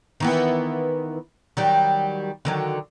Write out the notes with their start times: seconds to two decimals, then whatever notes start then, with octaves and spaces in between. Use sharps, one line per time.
0.20 D#3 E3 B3
1.57 D#3 F#3 G3
2.45 D3 D#3 F#3